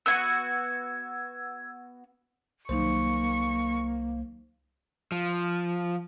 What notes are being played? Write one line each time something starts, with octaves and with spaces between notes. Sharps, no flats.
B3 F4 F#4 E6 G#6
C2 D#3 F#3 A#3 D#4 C5 C#6
F3